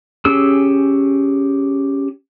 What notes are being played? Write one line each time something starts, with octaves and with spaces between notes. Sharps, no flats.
C#4 G4 G#4 E6